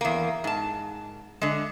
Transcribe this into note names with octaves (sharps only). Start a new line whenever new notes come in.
E2 A#3
G#2 A5
D3 G#3